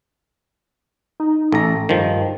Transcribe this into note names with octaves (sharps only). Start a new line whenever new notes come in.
D#4
A1 A4 A#5
G2 D#3 F3